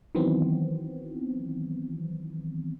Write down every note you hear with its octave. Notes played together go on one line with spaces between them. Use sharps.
D#3 E3 F#3 B3 C4